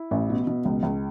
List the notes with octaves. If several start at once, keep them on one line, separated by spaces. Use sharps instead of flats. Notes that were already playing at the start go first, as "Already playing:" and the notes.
Already playing: E4
A1
B2
B2
C#2
C#2